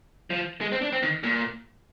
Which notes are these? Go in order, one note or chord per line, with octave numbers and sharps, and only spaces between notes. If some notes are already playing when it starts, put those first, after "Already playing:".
F3
G#3
C4
D4
C4
D#3
A#2